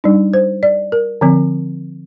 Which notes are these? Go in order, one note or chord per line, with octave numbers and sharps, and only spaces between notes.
G3 D4 D#4
C5
D5
A#4
D3 F3 C4